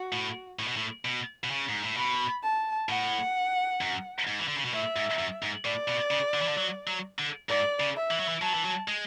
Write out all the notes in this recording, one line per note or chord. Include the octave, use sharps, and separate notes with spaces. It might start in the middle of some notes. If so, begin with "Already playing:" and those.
Already playing: F#4
A2
A2
B2
A2
B2
B2
C#3
G#2
A2
B2 B5
A5
A2 F#5
F#2
G#2
E3
D3
C#3
B2
A2 E5
G#2
F#2
G#2
A2 D5
B2
C#3
D3
E3
D3
F#3
F#3
D3
G#2 D5
C#3
E5
E3
F#3
E3
F#3 A5
E3
F#3
G#3